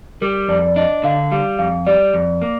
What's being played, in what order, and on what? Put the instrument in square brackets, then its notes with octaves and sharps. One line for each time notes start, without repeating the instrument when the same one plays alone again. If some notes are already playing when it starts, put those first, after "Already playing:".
[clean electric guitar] G3 [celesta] A#4
[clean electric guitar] F2 [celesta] D5
[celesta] D5
[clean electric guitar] D4 [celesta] D#5
[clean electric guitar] D3 [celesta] F5
[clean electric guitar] G3 [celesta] F5
[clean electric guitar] F2 [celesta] F5
[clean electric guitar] G3 [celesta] D5
[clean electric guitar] F2
A#3